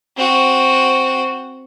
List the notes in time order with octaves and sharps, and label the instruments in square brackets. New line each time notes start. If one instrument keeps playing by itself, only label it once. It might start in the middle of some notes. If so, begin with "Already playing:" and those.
[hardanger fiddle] C4 F#4